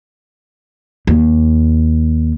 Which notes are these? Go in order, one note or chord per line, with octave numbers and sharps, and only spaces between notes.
D#2